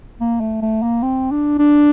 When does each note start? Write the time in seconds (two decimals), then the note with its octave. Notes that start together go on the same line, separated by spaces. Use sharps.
0.21 A#3
0.41 A3
0.62 A3
0.82 A#3
1.03 C4
1.31 D4
1.59 D4